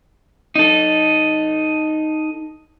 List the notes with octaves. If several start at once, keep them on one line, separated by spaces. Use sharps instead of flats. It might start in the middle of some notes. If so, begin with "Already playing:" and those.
D#4 A4